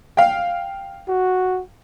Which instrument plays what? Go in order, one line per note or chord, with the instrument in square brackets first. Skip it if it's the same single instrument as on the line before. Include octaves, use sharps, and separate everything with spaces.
[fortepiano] F5 G5
[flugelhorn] F#4